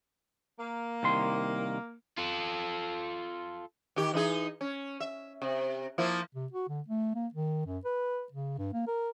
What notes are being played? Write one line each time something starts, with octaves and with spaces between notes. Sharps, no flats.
A#3
C2 D#3 C6
F4 A4
D#3 G4
E3 D#4 G#4
C#4
E5
C3
F3 A#3 E4
C3
F#4
D3
A3
A#3
D#3
F#2
B4
C#3
G2
A#3
A#4